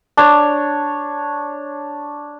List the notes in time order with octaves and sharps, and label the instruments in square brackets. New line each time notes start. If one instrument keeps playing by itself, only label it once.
[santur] D4 C#5